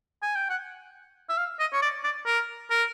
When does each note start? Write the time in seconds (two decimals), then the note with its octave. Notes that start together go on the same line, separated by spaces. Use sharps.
0.22 G#5
0.35 G5
0.49 F#5
1.29 E5
1.38 F5
1.59 D#5
1.73 C#5
1.82 D5
2.03 D5
2.26 A#4
2.70 A#4